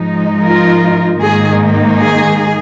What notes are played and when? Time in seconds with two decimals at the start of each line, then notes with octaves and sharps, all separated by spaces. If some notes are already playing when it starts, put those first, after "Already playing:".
Already playing: G#2 F3 G#3 D#4
0.44 F4 A#4
1.20 G#2 D#3 A#3 D#4 G#4
1.96 G#4